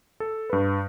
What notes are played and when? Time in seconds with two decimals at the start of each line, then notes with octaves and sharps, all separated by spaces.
0.20 A4
0.50 G2 B4